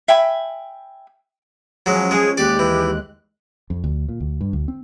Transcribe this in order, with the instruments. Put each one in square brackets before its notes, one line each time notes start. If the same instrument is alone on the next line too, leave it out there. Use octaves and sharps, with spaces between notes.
[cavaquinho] E5 G5 G#5 B5
[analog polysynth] F3 C#4 [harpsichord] F#3 G#3
[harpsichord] G#3 [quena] G#4
[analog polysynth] D#2 G#3 F#6 [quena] G4 [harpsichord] D5
[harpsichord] E3
[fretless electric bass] F2
D2
A#2
D2
G2
D2
C4